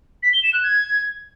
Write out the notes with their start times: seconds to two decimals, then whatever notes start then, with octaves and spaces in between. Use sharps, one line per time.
0.23 B6
0.33 G7
0.43 E7
0.53 F#6
0.63 G#6